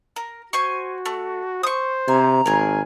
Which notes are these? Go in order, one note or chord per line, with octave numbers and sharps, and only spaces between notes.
A#4
F#4 C5 G#5 C#6
A3
C5 C#6 D#6
C3 G#5 A#5
G#1 G#4 A#4 G#5